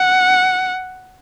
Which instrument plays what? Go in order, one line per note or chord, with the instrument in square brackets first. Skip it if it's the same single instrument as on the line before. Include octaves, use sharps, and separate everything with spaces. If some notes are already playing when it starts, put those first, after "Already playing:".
Already playing: [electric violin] F#5